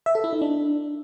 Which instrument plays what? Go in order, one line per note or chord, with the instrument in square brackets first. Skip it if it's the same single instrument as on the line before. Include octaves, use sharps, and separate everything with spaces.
[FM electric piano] E5
A4
E4
D#4
D4